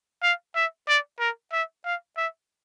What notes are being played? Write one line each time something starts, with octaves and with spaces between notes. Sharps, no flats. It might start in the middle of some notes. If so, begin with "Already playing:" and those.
F5
E5
D5
A#4
E5
F5
E5